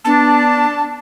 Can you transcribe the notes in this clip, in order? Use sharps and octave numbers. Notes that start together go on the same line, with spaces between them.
B3 D4 A5